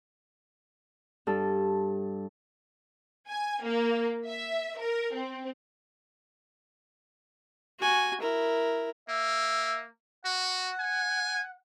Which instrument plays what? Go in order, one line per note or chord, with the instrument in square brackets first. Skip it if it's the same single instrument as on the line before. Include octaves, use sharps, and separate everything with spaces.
[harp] G2 A4
[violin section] G#5
A#3
E5
A#4
C4
[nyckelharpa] F#4 G#5
E4 A#4
[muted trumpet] A#3 [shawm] E5
[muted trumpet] F#4 [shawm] F#5
[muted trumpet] G#5